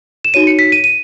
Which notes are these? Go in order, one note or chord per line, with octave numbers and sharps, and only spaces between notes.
E7
D#4 F#4 C#5 D#7
C#7
B6
D#7
D#7